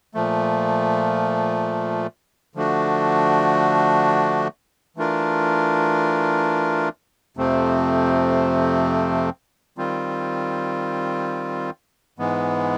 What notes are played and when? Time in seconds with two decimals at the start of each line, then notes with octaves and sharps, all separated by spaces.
0.14 A#2 F3 A3
2.55 D3 F3 A3 D4 F#4
4.96 E3 A3 D4 F4 A#4
7.37 F2 C3 F3 A3 C4
9.78 D#3 G3 C4 F4
12.19 G#2 E3 G#3 B3